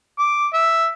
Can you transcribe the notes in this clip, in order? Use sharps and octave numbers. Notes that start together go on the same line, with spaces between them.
D6
E5